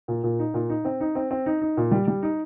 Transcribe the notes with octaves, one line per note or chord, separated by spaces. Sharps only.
A#2
A#2
D#4
A#2
D#4
C4
D#4
C4
C4
D#4
D#4
A#2
G3
G3
D#4